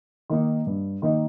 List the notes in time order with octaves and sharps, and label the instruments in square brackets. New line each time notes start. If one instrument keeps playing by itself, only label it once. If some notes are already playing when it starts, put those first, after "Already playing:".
[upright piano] D#3 A#3 D#4
G2
D#3 A#3 D#4